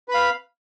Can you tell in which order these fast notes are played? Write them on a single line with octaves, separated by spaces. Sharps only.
B4 B5 F5